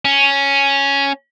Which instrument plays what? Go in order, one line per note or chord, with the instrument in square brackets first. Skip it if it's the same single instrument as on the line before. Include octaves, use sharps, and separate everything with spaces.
[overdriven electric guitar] C#4